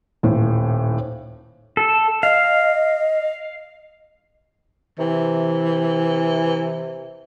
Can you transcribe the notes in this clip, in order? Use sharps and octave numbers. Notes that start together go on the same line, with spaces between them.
D#1 A2
A4
D#5 F5
C3 E3